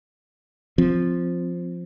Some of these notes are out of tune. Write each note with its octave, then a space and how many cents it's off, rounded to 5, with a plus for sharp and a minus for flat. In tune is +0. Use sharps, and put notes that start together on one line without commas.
F3 +0 C4 +0